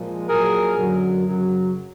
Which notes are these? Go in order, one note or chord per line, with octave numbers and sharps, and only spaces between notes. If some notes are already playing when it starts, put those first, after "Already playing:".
Already playing: A#2 F3 G#3
A#2 F#3 G#4 A#4
F#2 D3 F#3
F#2 C#3 F#3